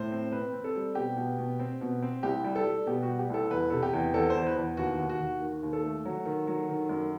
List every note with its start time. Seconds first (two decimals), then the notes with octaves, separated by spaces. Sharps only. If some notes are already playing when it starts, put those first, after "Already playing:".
Already playing: A2 C5
0.12 C4
0.32 C4 B4
0.53 C4
0.64 A4
0.75 G3
0.95 B2 G4
1.17 B2
1.38 B2
1.59 C4
1.81 B2
2.02 C4
2.23 C2 G4
2.44 G3
2.55 A4
2.65 G3
2.86 B2 G4
3.03 F#4
3.08 G3
3.19 G4
3.30 C2 A4
3.50 E2 B4
3.70 C3 A4
3.83 G4
3.93 E2
4.13 E2 A4
4.30 C5
4.35 E2
4.46 B4
4.56 E2
4.77 D#2 F#4
4.99 D#2
5.09 F#4
5.20 D#2
5.41 D#3
5.62 D#2
5.73 A4
5.83 A3
6.05 F#3
6.25 D#3
6.47 F#3
6.69 D#3
6.89 F#2